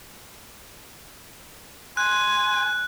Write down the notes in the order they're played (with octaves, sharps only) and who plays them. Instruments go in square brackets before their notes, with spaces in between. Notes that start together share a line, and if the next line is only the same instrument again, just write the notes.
[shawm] G#5 [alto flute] C6 [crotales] F#6